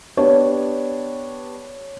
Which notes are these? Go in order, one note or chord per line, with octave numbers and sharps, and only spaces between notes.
B3 D4 G4 C#5